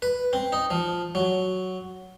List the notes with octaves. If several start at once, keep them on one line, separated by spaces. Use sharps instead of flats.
B4
C4
D#4
F3
F#3